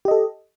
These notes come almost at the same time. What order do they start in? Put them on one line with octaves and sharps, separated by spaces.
G4 D#5 A4